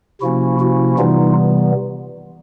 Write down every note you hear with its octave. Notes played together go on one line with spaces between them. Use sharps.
C3 F3 A#3 C#4 E4 F#4
E4 F#4
C3 E3 G3 B3 D#4 F4